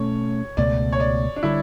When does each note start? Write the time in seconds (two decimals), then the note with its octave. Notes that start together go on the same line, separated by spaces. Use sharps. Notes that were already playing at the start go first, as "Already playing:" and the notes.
Already playing: B2 A3 C#4 C#5
0.57 C#2 B2 A3 D5
0.92 C#5
1.00 D5
1.36 D4
1.43 D3 G3 E4